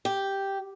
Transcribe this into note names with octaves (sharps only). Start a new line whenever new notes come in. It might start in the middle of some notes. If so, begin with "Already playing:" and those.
G4